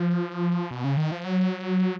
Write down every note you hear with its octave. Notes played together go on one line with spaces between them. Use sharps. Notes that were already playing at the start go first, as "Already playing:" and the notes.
Already playing: F3
B2
C#3
D#3
F3
F#3